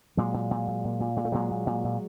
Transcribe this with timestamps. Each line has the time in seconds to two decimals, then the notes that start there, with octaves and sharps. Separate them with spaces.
0.17 A#2 F#3 G#3
0.34 A#2
0.51 A#2
0.67 A#2
0.85 A#2
1.00 A#2
1.16 A#2 G#3
1.25 A3
1.32 A#2 F#3 G#3
1.51 A#2
1.67 A#2
1.84 A#2